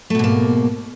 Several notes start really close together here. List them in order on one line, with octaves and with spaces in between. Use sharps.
A3 B2 G#2 A#3